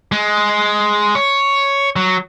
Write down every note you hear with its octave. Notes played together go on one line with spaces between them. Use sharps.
G#3
C#5
F#3